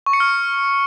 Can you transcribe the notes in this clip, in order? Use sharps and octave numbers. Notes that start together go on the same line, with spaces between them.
C#6
C#7
F6